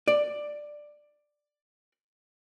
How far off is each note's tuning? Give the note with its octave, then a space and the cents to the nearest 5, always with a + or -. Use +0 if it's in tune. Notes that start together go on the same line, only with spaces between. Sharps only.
D5 +10